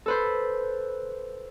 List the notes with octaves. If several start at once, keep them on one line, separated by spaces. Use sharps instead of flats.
A4 B4 C5